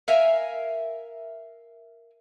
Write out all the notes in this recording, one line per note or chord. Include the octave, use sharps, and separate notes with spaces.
A#4 E5 F5 G#5